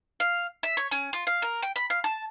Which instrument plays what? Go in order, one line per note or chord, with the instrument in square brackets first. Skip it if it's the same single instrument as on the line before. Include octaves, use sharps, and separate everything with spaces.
[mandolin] F5
E5
C#5
C#4
F4
F5
A#4
G5
B5
F5
A5